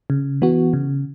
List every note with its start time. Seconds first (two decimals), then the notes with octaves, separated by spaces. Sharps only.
0.10 C#3
0.42 E3 B3 F#4
0.73 C#3